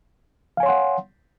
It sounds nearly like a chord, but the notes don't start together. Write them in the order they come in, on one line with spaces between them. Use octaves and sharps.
F5 G#5 C#5 C6 F#5